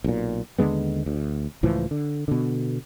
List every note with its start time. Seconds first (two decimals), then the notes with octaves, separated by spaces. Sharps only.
0.04 B1 A#2
0.59 D#2 D3 G#3 B3
1.06 D2
1.63 C#2 A2 E3 F3
1.91 D3
2.28 B2 D3